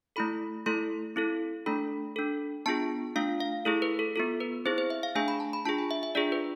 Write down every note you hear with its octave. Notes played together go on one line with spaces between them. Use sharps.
A3 E4 A4 B5
A3 E4 A4 C6
C4 E4 A4
A3 D4 A4 B5
D4 A4
B3 D4 F4 G#4 A5
A3 D4 F4 F5
F5
A3 E4 G#4 A4
B4
A4
B3 F4 A4
B4
C4 E4 G#4 C5
C5
E5
F5
A3 D4 G#4 G#5
B5
A5
B5
D4 F4 G#4 A5
G#5
E5
E5
D4 F4 G#4 D5
B4